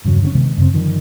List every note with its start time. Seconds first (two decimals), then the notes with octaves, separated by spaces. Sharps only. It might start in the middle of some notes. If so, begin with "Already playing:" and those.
0.05 E2 G2 C#3 F#3
0.22 D3 G3 C#4
0.35 C3 D#3 G#3 B3
0.58 F#2 C#3 C4
0.74 G2 D3 D#3 F3